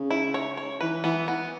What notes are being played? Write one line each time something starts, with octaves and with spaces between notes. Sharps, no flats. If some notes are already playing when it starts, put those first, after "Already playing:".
Already playing: C#3
E4
C#5
C#5
E3 B4
E3 B3
B3